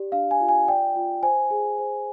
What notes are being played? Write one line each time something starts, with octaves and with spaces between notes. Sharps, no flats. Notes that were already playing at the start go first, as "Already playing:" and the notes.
Already playing: G4 D5
D4 F5
G#5
F4
G#5
D5 G5
F4
C5 G#5
G#4
C5